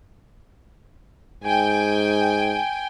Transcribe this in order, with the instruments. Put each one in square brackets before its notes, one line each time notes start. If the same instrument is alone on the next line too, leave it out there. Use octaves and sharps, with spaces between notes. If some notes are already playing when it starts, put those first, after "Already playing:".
[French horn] G#2 [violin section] G5 G#5